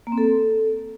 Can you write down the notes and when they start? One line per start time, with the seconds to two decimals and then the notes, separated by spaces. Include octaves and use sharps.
0.07 A#3
0.12 C4
0.18 A4